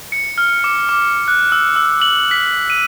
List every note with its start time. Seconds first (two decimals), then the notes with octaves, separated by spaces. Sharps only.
0.12 C#7
0.38 F6
0.64 D6
0.89 D6
1.28 F#6
1.52 E6
1.76 E6
2.02 F#7
2.31 B6
2.70 D#7